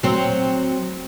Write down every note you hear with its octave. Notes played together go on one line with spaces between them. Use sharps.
F#3 C4